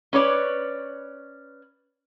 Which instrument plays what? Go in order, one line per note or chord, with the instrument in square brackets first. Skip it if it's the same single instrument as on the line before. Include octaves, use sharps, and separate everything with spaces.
[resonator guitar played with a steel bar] C#4 B4 C#5 D5